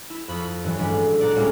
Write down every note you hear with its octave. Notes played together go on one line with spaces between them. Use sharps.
E4
F2 B5 D#6
G2 E3 F#3
A1 B2 G#3 D4 G#5 B6
A#2 D5 F#5 A#5
C#2 A2 G3 G#3 A#3 C#4